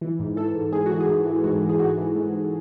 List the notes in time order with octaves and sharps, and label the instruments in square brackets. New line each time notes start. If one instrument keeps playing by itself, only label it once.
[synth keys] E3
G#2
E3 A4
G#2
G#2 G#4
E3 F#4
G#4
G#2
E3
G#2 F#4
E3
G#4
G#2 F#4
E3
G#2
G#2